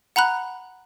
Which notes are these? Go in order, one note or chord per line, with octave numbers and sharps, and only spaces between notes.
F#5 A#5 B5 F#6